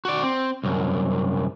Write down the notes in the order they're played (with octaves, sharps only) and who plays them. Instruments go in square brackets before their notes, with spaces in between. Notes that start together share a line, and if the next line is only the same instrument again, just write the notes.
[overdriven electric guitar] F#4 D5
C4
C2 F#2